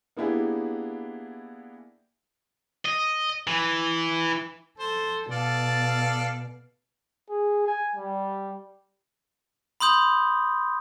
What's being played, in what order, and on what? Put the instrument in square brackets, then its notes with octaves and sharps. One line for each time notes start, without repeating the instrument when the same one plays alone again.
[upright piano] A#3 B3 D4 E4 G4 G#4
[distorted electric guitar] D#5
E3
[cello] A4 [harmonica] C5
[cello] B2 [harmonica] A4 D5 F5
[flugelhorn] G#4
G#5
G3
[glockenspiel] B5 C6 D#6 G6